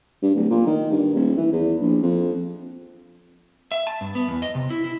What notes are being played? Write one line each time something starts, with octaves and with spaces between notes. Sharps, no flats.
G2
D1
A#2
D#3
G2
D#1
E3
E2
A#1
F2
E5
A5
G2
B3
E2
D#5
C3
E4
E4